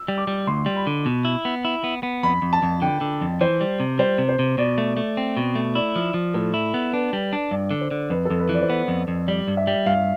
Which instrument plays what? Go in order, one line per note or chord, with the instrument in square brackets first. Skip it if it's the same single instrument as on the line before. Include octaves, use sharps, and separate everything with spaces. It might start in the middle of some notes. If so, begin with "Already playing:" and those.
Already playing: [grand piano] E6
[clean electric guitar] G3
[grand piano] D6
[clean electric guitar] G3
[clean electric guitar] D2 [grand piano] C6
[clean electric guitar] G3
[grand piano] B5
[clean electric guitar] D3
B2
E4
B3
E4
B3
B3
[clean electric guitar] F2 [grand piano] B5
[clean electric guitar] F2
[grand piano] A5
[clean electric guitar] F2
[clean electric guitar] D3 [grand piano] G5
[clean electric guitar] D3
F2
[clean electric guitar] E3 [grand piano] C5
[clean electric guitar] G3
C3
[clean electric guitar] G3 [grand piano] C5
[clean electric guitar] C3
[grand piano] C5
[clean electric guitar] C3
[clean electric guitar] B2 [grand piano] D5
[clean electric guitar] A3
A3
C4
B2
A3
[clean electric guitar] E4 [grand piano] D5
[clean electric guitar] F3
F3
[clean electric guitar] A2 [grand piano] A4
[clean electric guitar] E4
B3
[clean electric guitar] D4 [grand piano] B4
[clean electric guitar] G3
D4
[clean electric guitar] G2 [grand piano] D5
[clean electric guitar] D3
[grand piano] C5
[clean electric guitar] D3
[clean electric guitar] F2 [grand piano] B4
[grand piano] A4
[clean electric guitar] F2
[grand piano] B4
[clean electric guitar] E3 [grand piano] D5
[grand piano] C5
[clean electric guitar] B3 [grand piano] D5
[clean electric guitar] F2
F2
[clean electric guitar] G3 [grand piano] D5
[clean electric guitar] G2
[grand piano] E5
[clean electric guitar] G3
[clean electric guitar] G2 [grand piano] F5